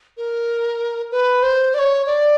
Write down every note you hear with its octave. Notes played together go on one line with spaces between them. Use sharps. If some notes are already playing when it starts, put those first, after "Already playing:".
A#4
B4
C5
D5
C#5
D5